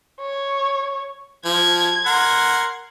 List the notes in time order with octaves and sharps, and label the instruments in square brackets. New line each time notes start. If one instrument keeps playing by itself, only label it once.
[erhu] C#5
[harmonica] F3 [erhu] G#6
[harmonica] A#4 F#5 C6